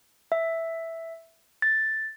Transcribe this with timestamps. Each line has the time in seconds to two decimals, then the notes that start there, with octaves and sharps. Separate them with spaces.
0.32 E5
1.62 A6